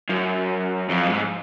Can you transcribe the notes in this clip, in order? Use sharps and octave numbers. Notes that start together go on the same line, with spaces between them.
F#2
F2
G#2